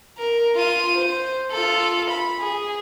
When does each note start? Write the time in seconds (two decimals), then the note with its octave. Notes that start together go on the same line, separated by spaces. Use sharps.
0.18 A#4
0.56 F4 D#7
0.97 C5
1.52 F4 A4
2.11 B5
2.40 G#4